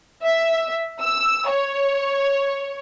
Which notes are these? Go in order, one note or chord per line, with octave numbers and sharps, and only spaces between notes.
E5
E6
C#5